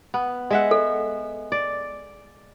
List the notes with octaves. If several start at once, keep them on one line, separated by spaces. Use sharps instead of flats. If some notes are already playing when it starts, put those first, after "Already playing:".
B3
G#3 E5 F#5
A4
D5